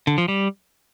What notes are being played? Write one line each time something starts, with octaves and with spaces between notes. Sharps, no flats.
D3
F3
G3